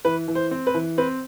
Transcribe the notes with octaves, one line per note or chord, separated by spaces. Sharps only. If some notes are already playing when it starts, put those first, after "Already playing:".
E3 B4
E3
C5
C4
B4
E3
C4 B4